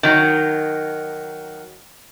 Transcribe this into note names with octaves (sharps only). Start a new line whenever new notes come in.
D#3 F#3